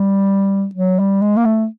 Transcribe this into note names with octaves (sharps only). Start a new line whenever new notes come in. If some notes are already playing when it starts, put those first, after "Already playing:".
Already playing: G3
F#3
G3
G#3
A#3
A3